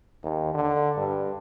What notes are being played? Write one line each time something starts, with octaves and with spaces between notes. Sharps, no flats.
D#2
D3
G2